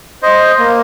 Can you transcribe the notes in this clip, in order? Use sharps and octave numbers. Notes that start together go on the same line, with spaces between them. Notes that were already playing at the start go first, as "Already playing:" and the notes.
C5 D#5
A#3